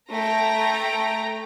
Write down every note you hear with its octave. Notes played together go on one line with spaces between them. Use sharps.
A3 G5 A#5 A#6